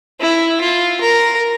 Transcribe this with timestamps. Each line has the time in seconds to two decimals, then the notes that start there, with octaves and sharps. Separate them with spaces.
0.20 E4
0.60 F4
1.01 A#4